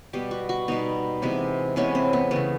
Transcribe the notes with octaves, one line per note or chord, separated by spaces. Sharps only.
B2 G3 B3 G4
F#4
F#4
B2 G3 B3 D#4
C3 E3 G#3 B3
C3 E3 G#3 B3 C#4
C4
B3
C#3 E3 A3 B3